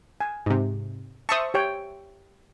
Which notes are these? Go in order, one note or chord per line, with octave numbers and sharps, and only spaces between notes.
G#5
G#2 C3
C5 E5 A5 C#6 D#6
G4 C#5 G5